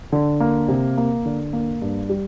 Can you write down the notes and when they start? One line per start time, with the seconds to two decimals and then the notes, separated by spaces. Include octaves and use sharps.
0.12 D3
0.40 A#3
0.68 C3
0.97 A#3
1.25 D3
1.53 A#3
1.82 G2
2.09 G3